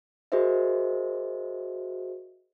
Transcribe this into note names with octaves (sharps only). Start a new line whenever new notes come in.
F#4 G#4 A#4 C5 D#5 E5